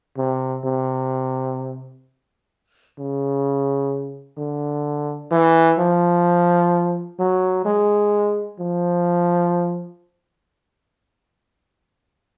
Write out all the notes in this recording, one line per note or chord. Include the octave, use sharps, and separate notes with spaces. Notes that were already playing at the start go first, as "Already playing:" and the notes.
C3
C3
C#3
D3
E3
F3
F#3
G#3
F3